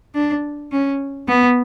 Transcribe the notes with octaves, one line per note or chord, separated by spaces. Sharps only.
D4
C#4
B3